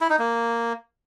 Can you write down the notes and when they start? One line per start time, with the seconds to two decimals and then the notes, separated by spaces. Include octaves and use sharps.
0.01 E4
0.10 D#4
0.19 A#3